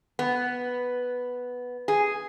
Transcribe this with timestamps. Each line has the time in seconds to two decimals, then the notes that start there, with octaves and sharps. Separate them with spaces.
0.19 B3
1.88 G#4